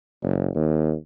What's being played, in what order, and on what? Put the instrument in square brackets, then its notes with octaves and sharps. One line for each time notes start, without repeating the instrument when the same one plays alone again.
[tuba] F#1
D#2